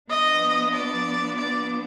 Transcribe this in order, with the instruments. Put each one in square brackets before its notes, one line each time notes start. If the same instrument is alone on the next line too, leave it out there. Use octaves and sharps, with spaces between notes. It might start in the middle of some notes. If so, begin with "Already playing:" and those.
[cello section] F3 B3 D4 [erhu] D#5
[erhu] D5
D5